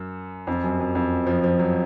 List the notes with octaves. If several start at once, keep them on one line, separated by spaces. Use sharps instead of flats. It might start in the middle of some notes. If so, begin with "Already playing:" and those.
Already playing: F#2
F2
F#2
F#2
F2
F3
F3
F#3